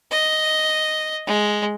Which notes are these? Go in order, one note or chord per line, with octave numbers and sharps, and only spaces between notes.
D#5
G#3